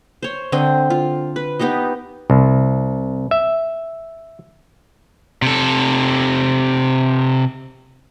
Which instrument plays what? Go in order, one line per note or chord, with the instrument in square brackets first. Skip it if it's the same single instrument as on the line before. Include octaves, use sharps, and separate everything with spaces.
[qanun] C5 C#5
D3 C4 D#5
F4
B4
B3 D#4 G4 D#5
[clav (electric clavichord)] C2
E5
[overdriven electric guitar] C3 A4